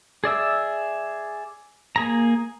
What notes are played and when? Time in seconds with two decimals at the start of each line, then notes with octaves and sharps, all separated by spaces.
0.24 G#4 D5 E5 E6
1.96 A#3 G#4 A#5